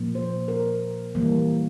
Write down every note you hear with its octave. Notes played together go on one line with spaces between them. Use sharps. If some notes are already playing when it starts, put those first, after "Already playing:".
Already playing: A#2 F3 A#3
C5
A#4
E3 G3 A#3